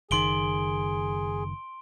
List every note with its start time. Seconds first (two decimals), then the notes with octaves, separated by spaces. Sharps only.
0.11 F#1 D#3 G#4 C6 D7 G7